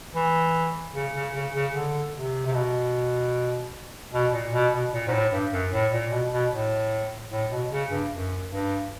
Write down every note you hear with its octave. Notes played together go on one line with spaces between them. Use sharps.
E3
C#3
C#3
C#3
C#3
D3
C3
C3
B2
B2
A#2
B2
B2
A#2
G#2
A2
G2
F#2
A2
A#2
B2
B2
A2
A2
B2
C#3
G2
F#2
G2